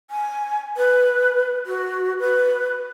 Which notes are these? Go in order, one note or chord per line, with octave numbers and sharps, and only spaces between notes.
G#5
B4
F#4
B4